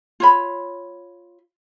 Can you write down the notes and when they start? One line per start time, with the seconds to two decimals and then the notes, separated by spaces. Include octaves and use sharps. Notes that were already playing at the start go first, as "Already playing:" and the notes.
0.20 F4 C#5 B5